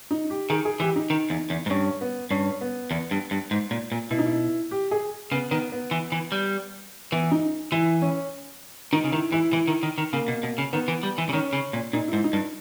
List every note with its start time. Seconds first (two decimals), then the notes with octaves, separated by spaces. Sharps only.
0.11 D#4
0.30 G4
0.50 D#3 G#4
0.65 G#4
0.80 E3 G4
0.96 D#4
1.10 D#3
1.30 E2
1.50 E2
1.66 G#2
1.70 G2 C#4
2.01 B3
2.31 G2 C#4
2.61 B3
2.91 E2
3.11 G2
3.31 G2
3.51 G#2
3.71 A#2
3.92 A#2
4.11 B2 E4
4.18 D#4
4.26 E4
4.71 G4
4.91 G#4
5.31 C#3 B3
5.51 D#3 B3
5.72 B3
5.91 E3
6.12 E3
6.32 G3
7.12 E3 B3
7.31 D#4
7.72 E3 E4
8.02 C#4
8.93 D#3 D#4
9.04 C#3
9.12 D#3 E4
9.32 E3 E4
9.53 E3 E4
9.68 D#3
9.83 D#3
9.98 D#3
10.13 C#3 A#3
10.28 B2
10.43 B2
10.58 C#3
10.73 D#3 B3
10.88 E3
11.03 G3
11.18 E3
11.29 C#3
11.33 D#3 C#4
11.53 C#3
11.73 A#2
11.93 A#2 D#4
12.08 G#2 E4
12.24 D#4
12.33 G2